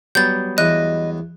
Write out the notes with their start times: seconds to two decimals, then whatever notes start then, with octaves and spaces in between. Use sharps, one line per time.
0.15 F#3 G3 B3 G6 A6
0.58 E2 D#5 F#6